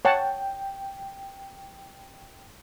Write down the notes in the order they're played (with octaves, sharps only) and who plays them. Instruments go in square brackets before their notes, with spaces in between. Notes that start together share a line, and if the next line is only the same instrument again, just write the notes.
[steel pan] C#5 F#5 A5 [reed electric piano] G5